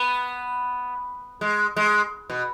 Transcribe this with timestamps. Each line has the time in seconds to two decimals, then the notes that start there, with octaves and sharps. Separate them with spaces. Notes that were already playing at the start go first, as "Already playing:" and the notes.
Already playing: B3
1.41 G#3
1.76 G#3
2.30 B2